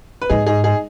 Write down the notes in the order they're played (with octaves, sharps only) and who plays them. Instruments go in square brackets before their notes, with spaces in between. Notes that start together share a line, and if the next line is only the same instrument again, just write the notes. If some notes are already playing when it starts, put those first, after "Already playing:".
[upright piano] B4
[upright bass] G#2 [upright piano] D#4 G#4
[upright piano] D#4 G#4
D#4 G#4